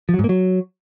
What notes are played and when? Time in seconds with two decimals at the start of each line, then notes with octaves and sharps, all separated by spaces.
0.09 F3
0.14 F#3
0.19 G#2
0.24 A#3
0.29 F#3